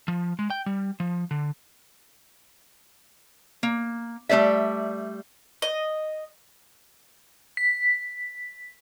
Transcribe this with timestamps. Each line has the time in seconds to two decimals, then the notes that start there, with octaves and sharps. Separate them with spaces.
0.08 F3
0.39 G#3
0.50 G5
0.66 G3
1.00 F3
1.31 D3
3.63 A#3
4.29 G3 A3 C5 D5 E5
5.62 D#5
7.57 B6